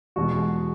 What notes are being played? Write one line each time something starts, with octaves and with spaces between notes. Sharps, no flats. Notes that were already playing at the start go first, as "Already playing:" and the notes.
E2 B2 G#3 F#4